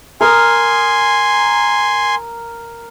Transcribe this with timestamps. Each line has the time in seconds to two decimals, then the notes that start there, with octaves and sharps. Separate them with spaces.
0.21 A#4 G#5 A#5 C6 D#6